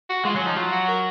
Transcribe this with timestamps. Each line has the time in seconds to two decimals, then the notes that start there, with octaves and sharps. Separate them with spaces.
0.09 F#4
0.25 G#3 F4
0.35 F#3 C#4
0.46 F3 D#4
0.56 F#3 F4
0.72 F#4
0.88 A#4